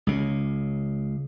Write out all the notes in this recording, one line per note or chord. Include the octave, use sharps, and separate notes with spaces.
C#2 C#3